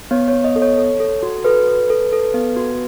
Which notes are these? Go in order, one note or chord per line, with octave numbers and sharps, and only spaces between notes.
B3 C#5
C#5
B3
D#5
A4
C#5
A4
A4
F#4
A4 B4
A4
A4
A4
B3
F#4